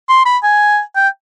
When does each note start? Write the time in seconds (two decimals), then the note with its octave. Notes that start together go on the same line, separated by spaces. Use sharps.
0.08 C6
0.26 B5
0.43 G#5
0.96 G5